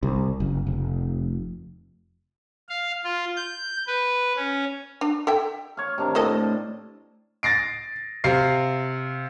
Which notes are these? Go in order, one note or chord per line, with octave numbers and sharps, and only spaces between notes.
C2
F#1
F1
F5
F4
G6
B4
C#4
D4
A4 E5 G5
C#5 F5
C3 D#3 D4
A2 A#3 A4 D#5 A5
A6 A#6 C7 D7
C3 F5 C7